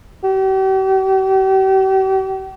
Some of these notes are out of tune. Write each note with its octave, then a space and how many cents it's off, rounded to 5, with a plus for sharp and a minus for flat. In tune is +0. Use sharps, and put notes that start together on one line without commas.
G4 -40